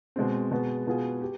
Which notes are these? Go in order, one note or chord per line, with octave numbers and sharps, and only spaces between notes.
B2 G#3 C4
B2 G#3 B3
B2 B3 F4 G#4
G4